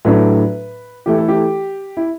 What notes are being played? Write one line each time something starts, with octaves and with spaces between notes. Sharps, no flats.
A2 F#3 A3 D4 B4
E3 A3 E4 G4
A4
G4
E4